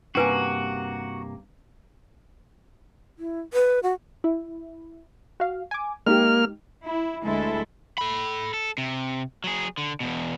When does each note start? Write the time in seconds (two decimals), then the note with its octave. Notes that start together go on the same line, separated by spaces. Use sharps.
0.15 G2 C3 A#3 C#4 F#4 B4 G#5
3.19 E4
3.53 B4
3.83 F#4
4.24 E4
5.40 F#4 F5
5.71 G#5 D6
6.06 G#3 A#3 D#4 G4 F6
6.85 E4
7.25 D2 G#3 E4 A4
7.98 A4 B5
8.54 A4
8.78 C3
9.44 F#3 G#4
9.78 D3
10.00 E2 B2